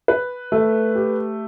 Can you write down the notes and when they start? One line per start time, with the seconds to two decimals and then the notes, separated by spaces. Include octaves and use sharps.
0.08 B4
0.52 A3
0.95 G4